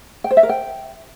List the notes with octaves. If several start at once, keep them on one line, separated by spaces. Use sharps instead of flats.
G5
C5
E5
A#4
G5